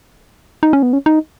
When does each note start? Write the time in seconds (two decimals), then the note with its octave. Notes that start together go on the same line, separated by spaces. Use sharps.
0.63 D#4
0.73 C#4
0.83 B3
0.93 C#4
1.06 D#4